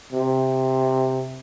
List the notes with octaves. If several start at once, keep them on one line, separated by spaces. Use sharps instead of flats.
C3